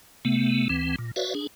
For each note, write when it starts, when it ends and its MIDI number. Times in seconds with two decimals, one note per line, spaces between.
0.25 0.68 48
0.25 0.68 57
0.25 0.68 59
0.69 0.96 38
0.69 0.96 52
0.69 0.96 60
0.99 1.11 46
1.16 1.34 66
1.16 1.34 71
1.16 1.34 73
1.16 1.34 74
1.16 1.34 76
1.16 1.34 77
1.35 1.47 62
1.35 1.47 68